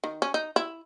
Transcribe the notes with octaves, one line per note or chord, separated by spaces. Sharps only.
D#3
C#4
D#4
E4